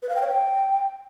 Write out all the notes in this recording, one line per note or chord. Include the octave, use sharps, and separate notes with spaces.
B4
F5
G5
C#5
G5